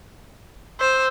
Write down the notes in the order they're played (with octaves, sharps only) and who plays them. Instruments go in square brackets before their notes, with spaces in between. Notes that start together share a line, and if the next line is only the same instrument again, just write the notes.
[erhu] C5 [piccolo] E6